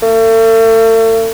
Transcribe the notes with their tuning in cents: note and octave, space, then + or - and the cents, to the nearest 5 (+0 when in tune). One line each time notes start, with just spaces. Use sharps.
A3 +40